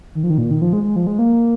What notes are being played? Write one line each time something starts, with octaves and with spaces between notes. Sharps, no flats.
D#3
F3
D#3
A#2
D#3
F3
G#3
G#3
F3
G#3
A#3